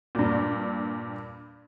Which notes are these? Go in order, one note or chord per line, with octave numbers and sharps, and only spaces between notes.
G2 A#2